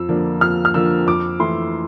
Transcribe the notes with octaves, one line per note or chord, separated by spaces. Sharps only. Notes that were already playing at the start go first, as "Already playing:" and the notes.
Already playing: F2 E6
D3 F3 A#3 D4
F2 F6
F6
D3 F3 A#3 D4 E6
F2 D6
E3 A3 E4 C6